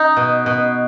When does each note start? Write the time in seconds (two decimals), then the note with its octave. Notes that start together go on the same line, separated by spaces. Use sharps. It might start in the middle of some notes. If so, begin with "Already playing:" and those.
Already playing: D#4
0.17 B2
0.46 B2